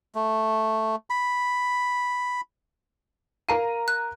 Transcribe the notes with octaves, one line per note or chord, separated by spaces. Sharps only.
A3
B5
A#4 F5 A#5 D#7
F#6